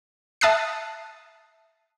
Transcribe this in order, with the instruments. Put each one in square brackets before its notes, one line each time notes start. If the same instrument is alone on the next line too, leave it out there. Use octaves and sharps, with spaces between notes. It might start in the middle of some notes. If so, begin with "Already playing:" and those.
[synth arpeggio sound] E5 A5 D#6 F#6 C7